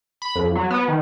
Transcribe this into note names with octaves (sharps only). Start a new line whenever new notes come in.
B5
F2
F#3
B3
D#3